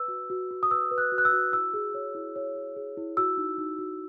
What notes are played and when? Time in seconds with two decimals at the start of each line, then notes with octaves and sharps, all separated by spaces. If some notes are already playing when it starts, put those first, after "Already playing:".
Already playing: B4 E6
0.08 F#4
0.30 F#4
0.51 F#4
0.63 D#6
0.71 B4 E6
0.91 B4
0.98 F#6
1.12 F#4
1.18 F#6
1.25 E6
1.32 F#4
1.52 E4 E6
1.74 G#4
1.94 C#5
2.15 E4
2.36 C#5
2.55 G#4
2.77 G#4
2.97 E4
3.17 F#4 E6
3.37 D#4
3.58 D#4
3.79 F#4